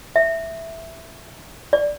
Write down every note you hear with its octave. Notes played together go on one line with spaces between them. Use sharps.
E5
D5